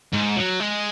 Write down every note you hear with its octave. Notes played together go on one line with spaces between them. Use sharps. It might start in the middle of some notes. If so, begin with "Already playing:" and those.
G#2
F#3
G#3